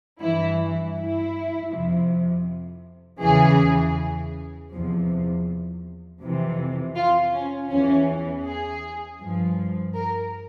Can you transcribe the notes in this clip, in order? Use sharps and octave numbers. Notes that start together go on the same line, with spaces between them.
G2 E3 E4
E4
F2 C3 F3
E2 C#3 E3 G#4
E2 C3 F3
F2 C3 E3
F4
C#4
E2 E3 C#4
G#4
G2 F3
A#4